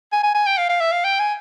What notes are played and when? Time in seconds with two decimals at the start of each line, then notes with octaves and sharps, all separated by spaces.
0.12 G#5
0.23 G#5
0.34 G#5
0.46 G5
0.58 F5
0.69 F5
0.81 E5
0.92 F5
1.04 G5
1.19 G#5